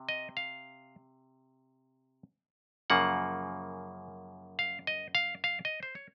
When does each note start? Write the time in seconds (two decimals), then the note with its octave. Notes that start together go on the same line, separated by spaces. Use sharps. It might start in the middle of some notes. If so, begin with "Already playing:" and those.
Already playing: C3
0.09 D#5
0.37 F5
2.90 F#2 C#3 F3 A#3 F#5
4.59 F5
4.87 D#5
5.15 F5
5.44 F5
5.65 D#5
5.83 C5
5.95 C#5